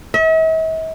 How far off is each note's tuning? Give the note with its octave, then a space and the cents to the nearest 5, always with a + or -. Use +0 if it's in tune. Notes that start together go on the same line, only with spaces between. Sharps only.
E5 -45